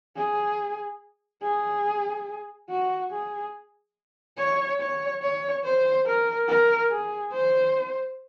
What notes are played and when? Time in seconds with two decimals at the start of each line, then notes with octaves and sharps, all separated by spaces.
0.16 G#4
1.43 G#4
2.69 F#4
3.11 G#4
4.37 C#5
4.80 C#5
5.22 C#5
5.64 C5
6.06 A#4
6.48 A#4
6.91 G#4
7.33 C5